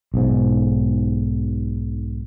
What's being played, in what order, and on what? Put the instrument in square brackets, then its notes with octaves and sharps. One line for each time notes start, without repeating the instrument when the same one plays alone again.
[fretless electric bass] B1 G#2